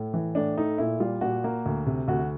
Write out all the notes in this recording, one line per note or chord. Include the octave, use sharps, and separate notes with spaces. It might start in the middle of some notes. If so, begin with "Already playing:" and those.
Already playing: A2
E3
A2 D4
A3 D#4
A#2 E4
G3 F4
A#2 F#4
A#3
D2
C3
D2 F#4